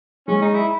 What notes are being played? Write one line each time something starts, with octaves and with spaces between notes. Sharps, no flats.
G#3 C#4
D#4
E4